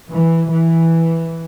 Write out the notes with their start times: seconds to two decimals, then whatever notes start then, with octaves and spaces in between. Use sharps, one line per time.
0.10 E3
0.50 E3